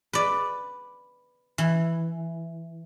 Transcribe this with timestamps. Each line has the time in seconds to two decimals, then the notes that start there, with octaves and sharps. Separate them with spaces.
0.13 B4 D5
1.58 E3